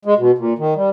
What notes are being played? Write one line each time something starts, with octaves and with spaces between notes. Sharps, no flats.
G#3
B2
A#2
D#3
G3